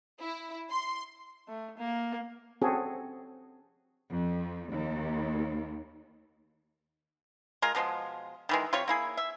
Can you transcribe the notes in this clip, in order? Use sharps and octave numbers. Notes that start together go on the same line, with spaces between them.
E4
C6
A3
A#3
C4 C#4 F#4 G#4 A4
F2
D#2
G#3 F4 A#4
B2 F3 G3 G#3
D#3 E3 G#3
C3 F4 C#5 C#6
A#3 E4 G#4
E5